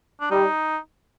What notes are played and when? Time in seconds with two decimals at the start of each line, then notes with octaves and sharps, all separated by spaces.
0.21 D4
0.31 G3 D#4